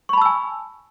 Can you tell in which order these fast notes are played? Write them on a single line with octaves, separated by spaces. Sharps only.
C#6 B5 A5 E6 G#5